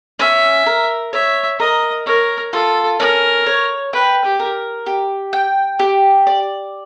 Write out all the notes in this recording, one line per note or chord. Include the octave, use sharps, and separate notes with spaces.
C#4 E5
A#4
C#5 E5
A#4 D#5
A#4 C#5
F4 A4
C#4 A#4
C#5
B4 G5
G4
A#4
G4
G5
G4
D5